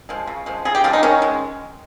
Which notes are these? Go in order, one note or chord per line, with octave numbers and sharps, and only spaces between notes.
F3 G#3
C#3
F3 G#3
C#3 G#4
G4
F3 G#3 F4
D#4
D#3 C#4
G#3